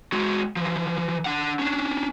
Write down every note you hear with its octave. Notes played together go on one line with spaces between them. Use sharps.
G#3 F#4
E3 F3
D4 F#5
C#4 D4